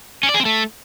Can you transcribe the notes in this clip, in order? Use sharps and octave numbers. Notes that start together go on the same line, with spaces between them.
C#4
D5
G#4
C4
A3